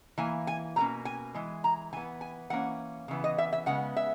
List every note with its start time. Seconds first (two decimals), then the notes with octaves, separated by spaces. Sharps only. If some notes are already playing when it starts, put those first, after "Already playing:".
0.18 E3 A#3 G#5
0.47 G#5
0.76 B2 A#3 C#4 A#5
1.05 G#5
1.34 E3 G#3
1.64 A#5
1.93 E3 B3 G#5
2.21 G#5
2.50 E3 A#3 C#4 F#5
3.08 C#3 E3 B3
3.24 D#5
3.38 E5
3.53 E5
3.66 C#3 G#3 B3 F#5
3.96 E5